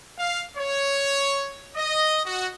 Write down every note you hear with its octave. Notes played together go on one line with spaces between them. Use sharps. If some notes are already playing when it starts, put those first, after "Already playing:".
F5
C#5
D#5
F#4